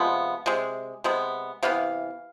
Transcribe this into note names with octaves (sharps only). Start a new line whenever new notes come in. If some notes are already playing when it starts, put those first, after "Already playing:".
Already playing: C3 F3 G#3 B3
C3 G#3
C3 G#3 B3
C3 E3 B3 F5